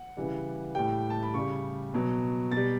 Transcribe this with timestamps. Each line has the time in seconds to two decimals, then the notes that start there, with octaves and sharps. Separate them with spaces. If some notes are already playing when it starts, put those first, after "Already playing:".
Already playing: F#5
0.17 C#3 E3 G3
0.75 A2 G3 G5
1.10 A5
1.23 B5
1.34 C#3 G3 C#6
1.94 B2 F#3
2.52 B2 A6
2.57 G3